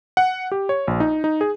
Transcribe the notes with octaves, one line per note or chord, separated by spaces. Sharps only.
F#5
G4
C#5
A#1
D#4
D#4
G#4